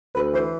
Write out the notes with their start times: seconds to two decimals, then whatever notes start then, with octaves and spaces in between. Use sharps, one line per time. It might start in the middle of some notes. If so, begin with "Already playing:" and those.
0.15 D2 B4
0.33 E3 C5